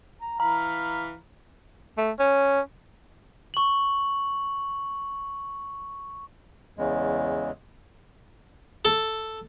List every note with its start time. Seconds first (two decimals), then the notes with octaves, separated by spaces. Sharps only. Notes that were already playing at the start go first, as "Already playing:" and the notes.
0.21 A#5
0.40 E3 F5 A#5 B5
1.97 A3
2.19 C#4
3.54 C#6 F#7
6.78 E2 C#3 G#3
8.85 A4